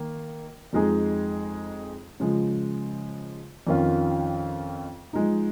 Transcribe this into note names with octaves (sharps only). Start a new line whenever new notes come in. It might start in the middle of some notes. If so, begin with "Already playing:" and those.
Already playing: D#3 A#3
F2 F3 G#3 D#4 G#4
C#3 F3 G#3
F2 D#3 C#4 F4
F3 G#3 D#4